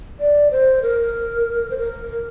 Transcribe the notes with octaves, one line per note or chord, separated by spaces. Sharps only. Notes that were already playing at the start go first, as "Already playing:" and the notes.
D5
C5
A#4
C5
A#4